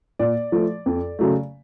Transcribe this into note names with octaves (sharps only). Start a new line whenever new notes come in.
A#2 D5
F3 A3
F2
C#3 F#3 A3